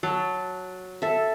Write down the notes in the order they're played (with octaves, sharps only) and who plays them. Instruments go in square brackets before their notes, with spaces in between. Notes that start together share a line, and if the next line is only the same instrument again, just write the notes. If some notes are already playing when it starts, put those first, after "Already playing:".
[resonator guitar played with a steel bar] F#3 [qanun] A5
[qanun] A4 E5